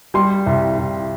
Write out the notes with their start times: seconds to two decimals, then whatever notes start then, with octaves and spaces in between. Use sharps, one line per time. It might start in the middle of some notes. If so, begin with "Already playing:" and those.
0.14 G3 C6
0.46 C2
0.78 C2